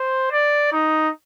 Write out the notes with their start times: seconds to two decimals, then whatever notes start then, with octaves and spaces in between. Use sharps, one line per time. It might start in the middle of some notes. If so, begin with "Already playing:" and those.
Already playing: C5
0.32 D5
0.72 D#4